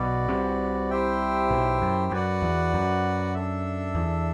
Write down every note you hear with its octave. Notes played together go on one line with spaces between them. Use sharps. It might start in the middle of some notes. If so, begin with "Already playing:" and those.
Already playing: B1 B2 F#4 B4 D5
C2 C3
E4 G4 C5 E5 G5
B1 B2
F#2
F#2 F#4 B4 D5 F#5
E2
F#2
D4 A4 E5
E2